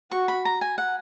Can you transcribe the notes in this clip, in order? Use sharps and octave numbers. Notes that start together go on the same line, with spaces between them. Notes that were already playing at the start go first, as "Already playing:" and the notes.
F#4 C#6
B5
A#5
G#5
F#5